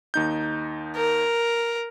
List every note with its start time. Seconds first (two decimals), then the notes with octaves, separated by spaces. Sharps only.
0.14 D#2 D#4 G6
0.96 A#4